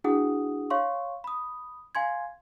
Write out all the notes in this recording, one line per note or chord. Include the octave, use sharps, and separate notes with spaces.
D4 E4 F#4 G#4 F#5 D#6
C#5 F5 C6 C#6
B5 D#6
F5 G#5 C6 G#6